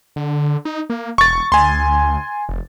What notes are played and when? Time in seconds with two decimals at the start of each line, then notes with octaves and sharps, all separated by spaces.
0.16 D3
0.65 D#4
0.90 A#3
1.18 E1 C#6 A6
1.52 D2 G#5 C6
2.49 F1